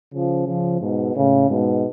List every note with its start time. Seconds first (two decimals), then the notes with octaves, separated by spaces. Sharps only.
0.13 C#3 F3
0.46 C#3 F3
0.81 G#2 B2
1.15 A2 C#3
1.49 G#2 B2